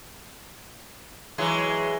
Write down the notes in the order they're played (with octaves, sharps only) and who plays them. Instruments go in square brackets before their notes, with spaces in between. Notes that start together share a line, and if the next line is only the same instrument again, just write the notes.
[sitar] E3 F#3 G#3